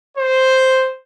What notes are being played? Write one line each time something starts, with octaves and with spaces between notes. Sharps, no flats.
C5